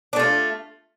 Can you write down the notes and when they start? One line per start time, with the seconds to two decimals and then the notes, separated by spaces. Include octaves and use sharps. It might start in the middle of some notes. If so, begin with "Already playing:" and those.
0.13 D4
0.16 A3
0.19 F4